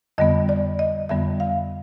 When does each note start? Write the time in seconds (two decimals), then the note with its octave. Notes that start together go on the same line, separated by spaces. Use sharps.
0.18 F2 D3 G3 B3 D#5
0.49 D5
0.79 D#5
1.09 F2 D3 G3 B3 E5
1.40 F5